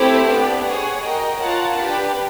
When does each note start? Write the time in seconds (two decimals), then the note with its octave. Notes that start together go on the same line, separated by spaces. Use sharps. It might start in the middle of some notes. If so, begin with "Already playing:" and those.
Already playing: A3 C4 E4 G4 C5
0.26 B3 D4 G4
0.64 G#4 C#5 F#5
1.02 F#4 A#4 D#5 G5
1.41 F4 A#4 C#5 F#5 A5
1.78 D4 G4 B4